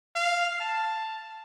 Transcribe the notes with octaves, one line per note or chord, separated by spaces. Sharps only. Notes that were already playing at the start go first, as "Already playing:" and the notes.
F5
A5